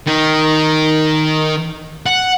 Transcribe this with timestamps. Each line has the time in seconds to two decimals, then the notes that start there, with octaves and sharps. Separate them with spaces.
0.06 D#3
2.06 F#5